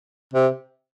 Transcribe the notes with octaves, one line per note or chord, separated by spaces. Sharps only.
C3